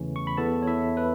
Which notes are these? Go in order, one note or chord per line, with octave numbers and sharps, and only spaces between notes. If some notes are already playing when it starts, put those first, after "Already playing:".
Already playing: E2 C#3 E3 A3 C#4
C#6
B5
E2 E3 B3 A4 A5
C#5
E4 E5
B4